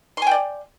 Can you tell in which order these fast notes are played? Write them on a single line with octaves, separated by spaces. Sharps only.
C6 G#5 G5 D5